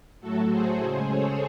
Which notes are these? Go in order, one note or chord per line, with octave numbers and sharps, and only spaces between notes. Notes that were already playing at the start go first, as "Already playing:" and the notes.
A2 F#3 A3 F#4 A4
G#4 C5
C#3 G#3
A4 C#5